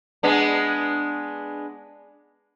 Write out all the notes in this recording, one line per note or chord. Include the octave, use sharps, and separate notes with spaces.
G#3 B3 D4